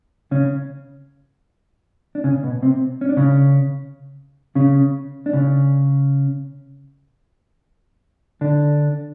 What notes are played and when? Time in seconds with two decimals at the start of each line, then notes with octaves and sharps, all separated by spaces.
0.31 C#3 C#4
2.15 D4
2.24 C#3 C#4
2.43 B2 B3
2.62 C3 C4
3.01 C#4
3.09 D4
3.17 C#3 C#4
4.55 C#3 C#4
5.26 D4
5.33 C#3 C#4
8.41 D3 D4